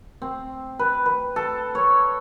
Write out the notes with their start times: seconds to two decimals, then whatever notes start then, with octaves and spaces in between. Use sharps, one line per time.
0.22 C4
0.79 B4
1.06 B4
1.36 A4
1.75 C#5